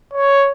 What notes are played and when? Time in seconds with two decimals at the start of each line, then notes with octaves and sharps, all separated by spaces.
0.13 C#5